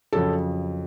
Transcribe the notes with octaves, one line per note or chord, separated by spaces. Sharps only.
F2 C#3 F#3 A4 C#5